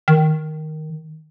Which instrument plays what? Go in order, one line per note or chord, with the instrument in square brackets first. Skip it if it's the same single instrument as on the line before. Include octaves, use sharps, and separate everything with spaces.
[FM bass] D#3